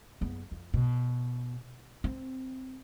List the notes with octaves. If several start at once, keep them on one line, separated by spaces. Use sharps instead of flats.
F#1 B3
F2
B2
C4